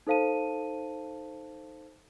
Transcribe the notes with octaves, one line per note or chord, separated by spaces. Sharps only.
D#4 A4 C5 F5 A5 D#7